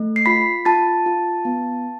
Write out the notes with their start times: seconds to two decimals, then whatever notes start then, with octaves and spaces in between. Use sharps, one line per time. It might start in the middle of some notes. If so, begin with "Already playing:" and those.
Already playing: A3
0.16 C7
0.26 F4 B5 B6
0.65 F4 A5 A6
1.06 F4
1.45 B3